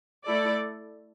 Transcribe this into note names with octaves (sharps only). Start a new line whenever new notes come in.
A3 E4 A4 D5